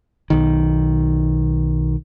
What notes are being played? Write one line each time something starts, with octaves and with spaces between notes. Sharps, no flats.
B1 D#3